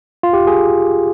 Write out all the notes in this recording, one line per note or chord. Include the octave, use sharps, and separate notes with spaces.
F4
G4
G#4